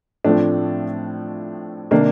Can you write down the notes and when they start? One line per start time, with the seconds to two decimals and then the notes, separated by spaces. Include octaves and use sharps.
0.25 A2 F3 A3 C4 D4
1.91 C3 D#3 A#3 D4